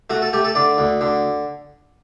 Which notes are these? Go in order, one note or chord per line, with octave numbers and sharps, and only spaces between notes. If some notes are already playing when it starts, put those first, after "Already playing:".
A3 F#4
A4
A3 G4
A4
D3 D5
D2
D3